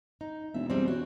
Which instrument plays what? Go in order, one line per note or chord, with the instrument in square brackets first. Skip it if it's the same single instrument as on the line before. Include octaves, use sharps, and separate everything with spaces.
[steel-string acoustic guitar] D#4
[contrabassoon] E1 [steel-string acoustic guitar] E5
[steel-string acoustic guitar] G3 G#3 C4
F#4 C#5